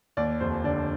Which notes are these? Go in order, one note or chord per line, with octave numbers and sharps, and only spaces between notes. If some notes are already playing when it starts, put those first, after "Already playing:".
D#2 D5
F1 C5
D3 D5